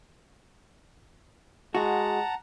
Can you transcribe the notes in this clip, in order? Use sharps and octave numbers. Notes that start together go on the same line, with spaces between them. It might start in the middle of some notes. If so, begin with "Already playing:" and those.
G#3 F#4 F#5 A5 A#5